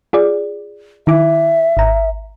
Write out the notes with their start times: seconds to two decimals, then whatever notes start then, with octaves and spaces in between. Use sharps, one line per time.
0.13 F4 G#4 D5
1.07 D#3 E4 E5 D6
1.77 G#1 A#5